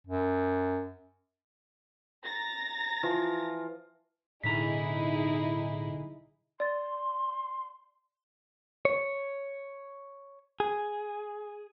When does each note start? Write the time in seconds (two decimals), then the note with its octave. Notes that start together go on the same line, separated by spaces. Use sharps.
0.07 F#2
2.24 A#5 A6 A#6
3.03 E3 F3 F4
4.44 B1 A2 D3 D#4 E4 G#4 A#5 B6
6.60 D5 C6 A6
8.85 C#5
10.60 G#4